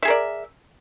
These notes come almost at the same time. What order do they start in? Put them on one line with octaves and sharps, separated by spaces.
E5 G#4 A#4 D5